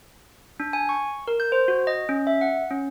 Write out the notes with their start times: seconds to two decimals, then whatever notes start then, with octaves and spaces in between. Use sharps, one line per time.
0.60 D4
0.73 G#5
0.89 C#6
1.28 A#4
1.40 G6
1.52 C5
1.68 F#4
1.87 D#5
2.09 C#4
2.27 E5
2.41 F#5
2.71 C#4